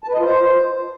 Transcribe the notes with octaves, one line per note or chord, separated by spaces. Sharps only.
A5
B4
D#5
F4
C5